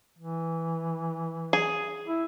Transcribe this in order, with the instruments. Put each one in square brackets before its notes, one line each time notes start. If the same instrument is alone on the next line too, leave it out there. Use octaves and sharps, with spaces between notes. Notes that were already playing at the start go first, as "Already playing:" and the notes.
[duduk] E3
[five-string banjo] G#4
[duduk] E4